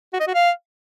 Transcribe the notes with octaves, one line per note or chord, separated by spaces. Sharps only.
F#4
D#5
F#4
F5